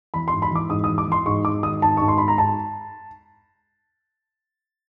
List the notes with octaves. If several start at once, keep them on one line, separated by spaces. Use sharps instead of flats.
E3 B5
C6
G#2
B5
E3 D6
G#2 D#6
D#6
E3
D6
E3 C6
G#2 C#6
G#2 D6
D#3 D#6
G#2 A5
G#2 C#6
C6
G#2 B5
A#5
G#2 A5